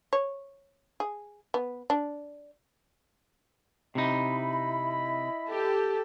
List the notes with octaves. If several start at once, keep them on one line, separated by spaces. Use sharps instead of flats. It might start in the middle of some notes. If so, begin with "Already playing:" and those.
C#5
G#4
B3
D4
C3 D#4 E4 D#5 B5
G4 A4